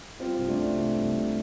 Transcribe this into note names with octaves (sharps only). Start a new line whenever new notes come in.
G3 C4 F4
C2
A3 D4
C2
C3 A3
C2
G3